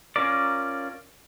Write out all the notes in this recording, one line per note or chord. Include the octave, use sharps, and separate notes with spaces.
C#4 F4 A#4 D5